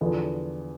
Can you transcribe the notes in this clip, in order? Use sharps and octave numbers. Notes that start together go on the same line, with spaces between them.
E2 D3 F3 B3